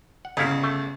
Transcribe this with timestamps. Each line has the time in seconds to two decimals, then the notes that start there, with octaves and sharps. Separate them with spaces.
0.25 F#5
0.37 G1 C#3 D#4 E4 F5
0.63 A3